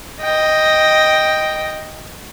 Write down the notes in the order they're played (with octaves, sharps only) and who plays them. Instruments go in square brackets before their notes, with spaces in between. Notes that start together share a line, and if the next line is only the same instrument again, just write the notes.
[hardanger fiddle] D#5 G5